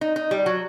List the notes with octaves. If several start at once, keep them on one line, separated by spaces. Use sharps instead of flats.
D#4
D#4
G3
F#3